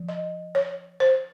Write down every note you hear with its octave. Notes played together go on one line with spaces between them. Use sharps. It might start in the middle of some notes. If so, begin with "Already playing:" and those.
Already playing: F3
D#5
C#5
C5